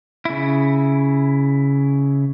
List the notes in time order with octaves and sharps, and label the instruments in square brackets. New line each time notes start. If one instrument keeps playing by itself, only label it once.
[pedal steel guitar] C#3 E4